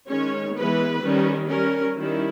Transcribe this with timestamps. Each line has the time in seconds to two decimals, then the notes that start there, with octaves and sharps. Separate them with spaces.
0.09 D#3 G#3 C#4 C#5
0.56 E3 G#3 B3 B4
1.03 D#3 G3 C#4
1.50 G3 C#4 A#4
1.96 D#3 G3 C#4 E4